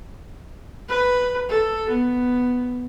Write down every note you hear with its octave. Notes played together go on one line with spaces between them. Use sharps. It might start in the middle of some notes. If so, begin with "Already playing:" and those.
B4
A4
B3